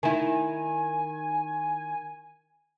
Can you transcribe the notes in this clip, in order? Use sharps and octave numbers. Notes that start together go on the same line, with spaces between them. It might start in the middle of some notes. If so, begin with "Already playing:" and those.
D#3 E4 G#5